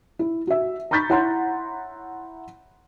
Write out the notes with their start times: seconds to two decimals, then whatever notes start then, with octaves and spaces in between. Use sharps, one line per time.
0.19 E4
0.47 F#4 E5
0.91 A#5 B5 C#6 G6 A6 B6
1.10 E4 C#5 F#5 A#5 C6